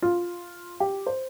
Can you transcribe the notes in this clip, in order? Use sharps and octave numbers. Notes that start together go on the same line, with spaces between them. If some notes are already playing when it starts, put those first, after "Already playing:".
F4
G4
C5